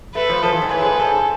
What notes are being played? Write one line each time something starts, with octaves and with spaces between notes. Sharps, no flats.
A3 B4
F3
F3 A4
E3
G#2
A2 B4
G#2
G#2 A4